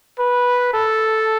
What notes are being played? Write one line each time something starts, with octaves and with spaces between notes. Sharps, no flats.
B4
A4